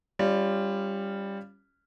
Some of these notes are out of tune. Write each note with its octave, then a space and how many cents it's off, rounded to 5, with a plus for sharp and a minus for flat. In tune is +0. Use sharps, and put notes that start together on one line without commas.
G3 +10 C#4 +0 F4 -15